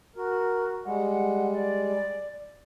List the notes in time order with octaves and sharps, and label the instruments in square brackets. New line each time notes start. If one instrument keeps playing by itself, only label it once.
[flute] F#4 [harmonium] A#4
[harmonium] G3 G#3 [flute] F#5
[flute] D5